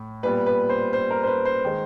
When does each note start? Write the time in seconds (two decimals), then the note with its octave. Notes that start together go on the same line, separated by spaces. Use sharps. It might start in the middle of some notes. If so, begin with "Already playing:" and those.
Already playing: A2
0.23 A#2 G3 B3 B4
0.46 B4
0.69 C5
0.93 C5
1.11 A#4
1.23 C5
1.27 B4
1.45 C5
1.64 D#3 G#3